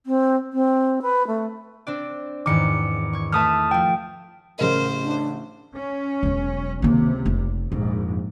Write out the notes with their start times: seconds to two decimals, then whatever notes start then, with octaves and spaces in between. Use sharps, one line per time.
0.06 C4
0.53 C4
1.02 B4
1.27 A3
1.87 C4 D4 D5
2.46 E2 G#2 D#3 D6 C#7
3.13 C#6 G#6
3.32 A3 B4 E5 A5 D#6 F6
3.71 F3 F4 G5
4.59 A1 C#3 A#4 C5 D#5
5.04 D4
5.74 C#4
6.23 E1 F#3
6.82 C#2 C3 D#3 A#3
7.26 F1
7.72 A#1 F2 G#2